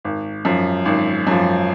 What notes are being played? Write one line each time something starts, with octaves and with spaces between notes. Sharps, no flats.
G#1
F#2 F3
G#1
F#2 F3